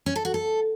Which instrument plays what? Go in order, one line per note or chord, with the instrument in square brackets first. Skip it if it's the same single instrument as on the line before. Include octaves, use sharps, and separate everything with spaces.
[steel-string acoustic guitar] C#4
A4
F#4
A4